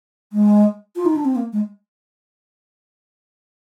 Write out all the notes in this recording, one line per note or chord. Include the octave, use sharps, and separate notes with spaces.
G#3
F4
D#4
D4
C4
A#3
G#3